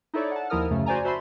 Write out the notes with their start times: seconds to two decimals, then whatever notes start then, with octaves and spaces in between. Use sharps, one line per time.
0.14 D#4 E4 A4 C#5 D5
0.31 F#5 A5
0.50 D#2 F3 E4 A#4 D#6 F6
0.71 F#2 C#3 A3
0.86 F#4 C5 D5 G#5 A#5
1.04 F#4 C5 E5 A5 B5 C6